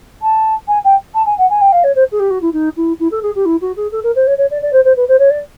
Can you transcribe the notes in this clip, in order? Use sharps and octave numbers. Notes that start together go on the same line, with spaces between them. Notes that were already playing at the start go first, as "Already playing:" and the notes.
A5
G#5
G5
A5
G#5
F#5
G#5
G5
F5
C#5
C5
G#4
G4
F#4
E4
D#4
E4
E4
A4
G#4
G4
E4
F#4
G#4
A4
A#4
C5
C#5
C#5
D5
D5
C5
C5
B4
C5
C#5
D5